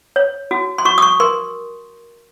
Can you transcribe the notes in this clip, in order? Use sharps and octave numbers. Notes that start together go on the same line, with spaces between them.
C#5
F#4
C6
F#4 C#6
D#6
C#6
A#4 C6